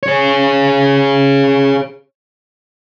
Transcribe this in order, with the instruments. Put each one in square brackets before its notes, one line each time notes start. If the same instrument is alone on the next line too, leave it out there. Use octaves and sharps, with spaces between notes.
[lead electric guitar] G#4 C#5